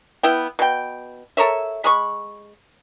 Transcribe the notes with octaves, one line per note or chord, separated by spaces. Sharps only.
B3 E4 G5
B2 G5
A4 A#4 C#5 E5
G#3 B5 C#6